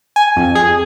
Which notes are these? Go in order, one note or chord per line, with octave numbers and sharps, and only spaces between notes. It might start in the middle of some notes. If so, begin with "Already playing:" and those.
G#5
F2
G#4